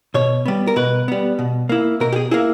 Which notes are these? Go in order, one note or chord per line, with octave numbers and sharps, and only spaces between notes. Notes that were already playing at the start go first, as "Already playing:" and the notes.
B2 C#5
G3 B3
A#4
B2 B4
G3 B3
B2
A#3 E4
B2 A#4
G4
G#4
A#3 E4 G#4